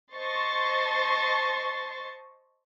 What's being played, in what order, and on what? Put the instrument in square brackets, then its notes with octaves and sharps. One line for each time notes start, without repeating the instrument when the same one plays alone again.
[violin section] C5 D#5 A5 C6 C#6 A6